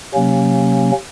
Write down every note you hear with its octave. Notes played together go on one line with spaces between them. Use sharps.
C3 F#3 A#3 C#4